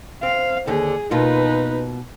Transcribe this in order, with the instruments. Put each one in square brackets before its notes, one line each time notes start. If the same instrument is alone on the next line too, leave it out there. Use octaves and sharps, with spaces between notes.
[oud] C4 [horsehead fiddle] F5
[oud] D#2 D3 [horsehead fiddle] G#4
[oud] B2 A#3 F4 [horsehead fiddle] D#4 B4